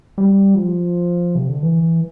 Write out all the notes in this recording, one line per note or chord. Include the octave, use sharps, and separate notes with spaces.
G3
F3
C3
D3
E3